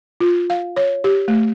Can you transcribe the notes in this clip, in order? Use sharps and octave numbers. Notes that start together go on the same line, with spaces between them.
F4
F5
C#5
G4
A3